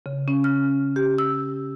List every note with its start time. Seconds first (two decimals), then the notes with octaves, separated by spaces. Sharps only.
0.06 C#3
0.28 C#4
0.44 F6
0.96 G4
1.18 E6